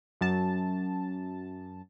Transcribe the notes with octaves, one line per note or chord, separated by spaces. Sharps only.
F#2 A5